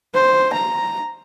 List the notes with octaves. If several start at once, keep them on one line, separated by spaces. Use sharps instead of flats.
C5
A#5